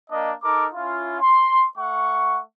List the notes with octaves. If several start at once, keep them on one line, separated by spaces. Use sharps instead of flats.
A#3 D4 D#5
D#4 A4 A#4 D6
C#4 E4 F4
C6
A3 F#5 C#6